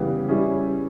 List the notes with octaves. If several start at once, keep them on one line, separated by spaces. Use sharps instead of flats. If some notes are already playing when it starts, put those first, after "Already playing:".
Already playing: C#3 E3 G3 B3 G4
G3 C#4 E4 G#4